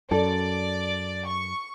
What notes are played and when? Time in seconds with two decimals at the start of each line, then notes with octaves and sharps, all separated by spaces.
0.11 F#2 A4 D5
1.28 C#6